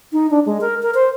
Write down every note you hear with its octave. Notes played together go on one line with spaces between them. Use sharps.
D#4
D4
G#3
A#4
A#4
C5